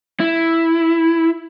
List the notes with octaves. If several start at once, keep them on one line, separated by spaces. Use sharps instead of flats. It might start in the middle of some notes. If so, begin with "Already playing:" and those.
E4